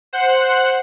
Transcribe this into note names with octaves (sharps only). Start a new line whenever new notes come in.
C5 F#5 F#6